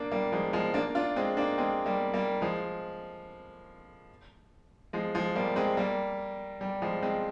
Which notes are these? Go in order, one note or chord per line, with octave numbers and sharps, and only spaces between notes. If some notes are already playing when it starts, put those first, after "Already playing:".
Already playing: A#3 D4
G3 A#3
F3 G#3
F3 G#3
A#3 D4
D4 F4
G#3 C4
A#3 D4
G#3 C4
G3 A#3
G3 A#3
F3 G#3
F3 G#3
F3 G#3
G3 A#3
G#3 C4
G3 A#3
G3
F3 G#3
G#3 C4